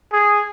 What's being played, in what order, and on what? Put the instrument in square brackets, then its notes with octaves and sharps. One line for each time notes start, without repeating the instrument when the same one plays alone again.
[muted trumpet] G#4